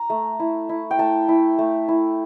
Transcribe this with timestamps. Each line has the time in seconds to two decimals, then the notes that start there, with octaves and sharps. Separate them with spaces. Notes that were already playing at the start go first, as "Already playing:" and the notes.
Already playing: A#5
0.10 A3
0.40 E4
0.69 E4
0.91 G5
0.98 A3 A5
1.29 E4
1.59 A3
1.88 E4